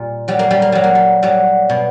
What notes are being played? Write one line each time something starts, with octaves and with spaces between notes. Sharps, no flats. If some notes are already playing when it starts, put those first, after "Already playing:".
Already playing: A#2 G3
F#3 G3
A#3
G3
A#3
F#3 G3
A#3
G3
F#3 G3
B2